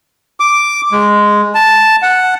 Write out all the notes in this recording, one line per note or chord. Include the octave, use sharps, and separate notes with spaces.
D6
G#3
A5
F#5